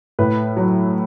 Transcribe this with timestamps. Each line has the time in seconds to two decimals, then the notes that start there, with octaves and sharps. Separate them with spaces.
0.19 A2 B4
0.57 F#3